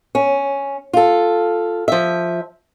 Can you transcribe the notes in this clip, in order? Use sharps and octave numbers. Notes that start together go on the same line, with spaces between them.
C#4
F4 A4
F3 E5